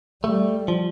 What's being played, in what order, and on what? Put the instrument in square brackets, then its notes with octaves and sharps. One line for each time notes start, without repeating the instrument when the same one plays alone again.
[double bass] G3 [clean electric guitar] A3
[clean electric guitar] F3